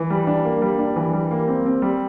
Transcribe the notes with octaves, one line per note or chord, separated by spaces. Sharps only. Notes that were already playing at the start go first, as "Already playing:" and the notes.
Already playing: E3
G3
D4
A#3
G3
D4
E3
G3
A#3
C4
C4
G3